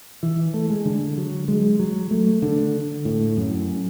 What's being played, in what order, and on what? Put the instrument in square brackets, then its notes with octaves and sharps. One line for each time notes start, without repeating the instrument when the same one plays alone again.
[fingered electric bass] E3
A3
G#3
D3
F#3
G#3
F#3
A3
D3
A2
F#2